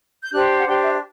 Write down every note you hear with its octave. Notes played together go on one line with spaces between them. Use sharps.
G6
D4 G4 C5 F#6
F#5
D4 G4 C5 G5
E5